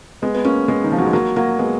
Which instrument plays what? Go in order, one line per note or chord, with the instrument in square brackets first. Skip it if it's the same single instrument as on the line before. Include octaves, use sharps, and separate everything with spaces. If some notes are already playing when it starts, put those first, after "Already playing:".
[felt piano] G#3 B3
B3
A#3 C#4
G#3 B3
D#3
F3
F#3
G#3
F#3 A#3
F#3 A#3
G#3 B3